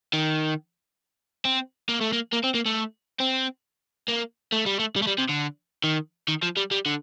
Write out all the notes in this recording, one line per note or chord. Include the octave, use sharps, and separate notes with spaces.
D#3
C4
A#3
A3
A#3
A#3
C4
A#3
A3
C4
A#3
A3
G3
A3
G3
A3
G3
C3
D3
D#3
D#3
F3
G3
G3
D3